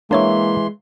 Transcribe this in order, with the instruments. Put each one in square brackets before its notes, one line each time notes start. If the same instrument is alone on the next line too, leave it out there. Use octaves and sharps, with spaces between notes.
[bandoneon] E3 C6 [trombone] G#3 [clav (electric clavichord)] A#3 E5 [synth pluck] D4 C#5 C#6